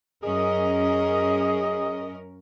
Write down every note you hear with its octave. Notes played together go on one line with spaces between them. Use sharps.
F#2 C#4 G#4 A#4 D#5